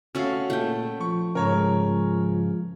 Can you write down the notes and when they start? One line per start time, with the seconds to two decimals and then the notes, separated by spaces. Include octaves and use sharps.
0.15 A3 C#4 F#4 A4 F5
0.50 A#2 A3 G5
1.01 F3 C#6
1.35 G#2 C#3 A#4 C#5